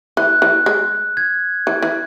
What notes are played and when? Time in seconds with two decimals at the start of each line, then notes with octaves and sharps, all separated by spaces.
0.17 E3 F#6
0.42 E3
0.66 G#3
1.17 G#6
1.67 E3
1.83 E3